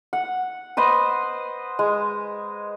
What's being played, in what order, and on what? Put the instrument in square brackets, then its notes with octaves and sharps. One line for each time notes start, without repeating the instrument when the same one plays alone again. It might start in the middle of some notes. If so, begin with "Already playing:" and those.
[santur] F#5
B4 C5 D#5 B5
G#3